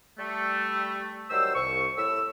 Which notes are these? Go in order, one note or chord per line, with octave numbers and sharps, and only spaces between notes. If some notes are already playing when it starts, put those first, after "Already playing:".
G3 A3
D#3 F#3 G3 C5 E6
C2 C#6
A2 E6